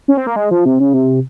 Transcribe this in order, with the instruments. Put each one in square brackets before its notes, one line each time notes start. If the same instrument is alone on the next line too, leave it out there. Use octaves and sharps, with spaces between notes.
[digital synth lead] C#4
C4
A#3
G#3
F3
C3
C#3
C3